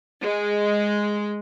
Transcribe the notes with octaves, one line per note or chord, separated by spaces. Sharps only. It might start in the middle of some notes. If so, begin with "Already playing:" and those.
G#3